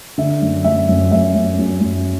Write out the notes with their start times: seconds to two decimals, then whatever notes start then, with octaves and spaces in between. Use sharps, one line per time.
0.18 D3 E5
0.42 F#2
0.64 F#2 E5
0.89 F#2
1.11 F#2 E5
1.35 F#2
1.59 F#2
1.81 F#2